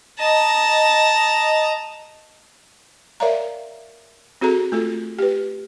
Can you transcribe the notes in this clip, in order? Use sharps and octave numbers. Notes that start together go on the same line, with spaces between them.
D#5 A5 A#5
A#4 C#5 D5 E5 F5 A#5
C4 F#4 G#4 A4 A#5
A3 F4 A4
G4 B4